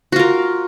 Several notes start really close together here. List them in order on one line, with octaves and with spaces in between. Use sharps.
F#4 F4 A#4